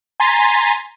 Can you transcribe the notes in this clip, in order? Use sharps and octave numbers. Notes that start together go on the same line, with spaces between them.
G#5 A#5 C6 A6 B6 D#7